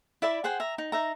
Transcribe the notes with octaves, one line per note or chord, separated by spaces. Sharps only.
E4 D5 E5 B5
G#4 C5 F#5 G5
E5 A#5
D#4
D#4 E5 A#5